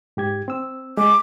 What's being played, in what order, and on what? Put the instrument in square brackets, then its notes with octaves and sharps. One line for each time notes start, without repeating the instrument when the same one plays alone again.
[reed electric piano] G#2 G4 G#6
C4 E6
[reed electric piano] G#3 [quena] D6